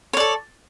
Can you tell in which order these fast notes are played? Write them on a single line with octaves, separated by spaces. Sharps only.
C#5 D5 A4